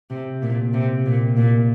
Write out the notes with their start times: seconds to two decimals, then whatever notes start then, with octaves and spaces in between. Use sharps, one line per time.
0.10 C3
0.42 A#2
0.74 C3
1.06 A#2
1.37 A#2